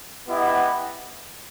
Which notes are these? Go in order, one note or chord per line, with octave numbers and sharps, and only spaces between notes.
B3 E4 G4 D#5 F#5